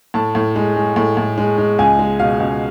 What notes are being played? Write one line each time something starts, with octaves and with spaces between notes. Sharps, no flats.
A2 A5
A2
G#3
G#3
A2
A2
G#3
G#3
C#2 G#5
G#3
B2 F5
C#2